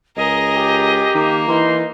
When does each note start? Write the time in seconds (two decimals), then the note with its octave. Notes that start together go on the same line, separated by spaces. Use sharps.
0.17 C#2 G#4 A#4 D#5
0.54 G4
1.14 D#3 A#3
1.48 E3 D#4 C6